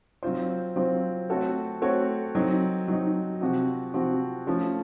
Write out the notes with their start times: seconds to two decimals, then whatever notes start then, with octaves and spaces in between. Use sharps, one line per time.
0.23 F#3 C4 F4 C5
0.76 F#3 C4 F4 C5
1.29 A3 C4 F#4 A4 C#5
1.82 A3 C4 F#4 A4 C#5
2.35 F#3 C4 D#4
2.88 F#3 C4 D#4
3.41 C3 F3 C4 F#4
3.94 C3 F3 C4 F#4
4.47 F3 A3 C#4